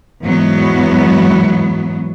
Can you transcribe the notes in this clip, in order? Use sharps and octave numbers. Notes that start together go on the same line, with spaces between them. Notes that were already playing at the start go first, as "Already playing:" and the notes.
E2 G#2 F#3 B3